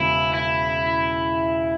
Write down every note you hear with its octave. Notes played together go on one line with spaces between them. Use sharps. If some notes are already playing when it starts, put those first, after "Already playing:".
Already playing: E1 C#3 E4
E4